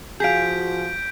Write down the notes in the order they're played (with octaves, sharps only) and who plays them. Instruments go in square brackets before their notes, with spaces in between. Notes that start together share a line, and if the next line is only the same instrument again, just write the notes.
[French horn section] F3 F#4 [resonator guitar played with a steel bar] G#4 F5 [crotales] G6 B6 D7